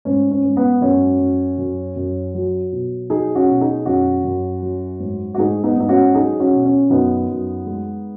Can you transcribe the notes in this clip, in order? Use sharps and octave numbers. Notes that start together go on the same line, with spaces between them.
G#2 C#4
C#4
G#2
B3
F#2 C#4 F#4
F#2
F#2
F#2
F#3
B2
F#3 D#4 G#4
C#4 F#4
B2
D#4 G#4
F#2 C#4 F#4
F#2
F#3
G#2
F#4
G#2 D#4 G#4
B3 D#4
G#2 D#4
C#4 F#4
F#3 D#4 G#4
C#4 F#4
B2
C#4
F#2 B3 D#4
F#2
G#3